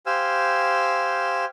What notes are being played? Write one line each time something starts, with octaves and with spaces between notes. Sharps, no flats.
G4 C5 F5 G#5 E6